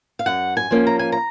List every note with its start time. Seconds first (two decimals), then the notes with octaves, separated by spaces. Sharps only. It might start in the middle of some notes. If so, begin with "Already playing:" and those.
0.19 F5
0.26 F#2 F#5
0.57 G#5
0.71 F3 A#3 C#4
0.87 A#5
0.99 G#5
1.12 A#5